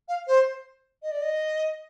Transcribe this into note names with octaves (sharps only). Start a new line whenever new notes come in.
F5
C5
D#5
D5
D#5